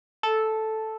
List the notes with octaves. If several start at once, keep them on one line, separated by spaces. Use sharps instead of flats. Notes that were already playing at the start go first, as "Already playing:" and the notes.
A4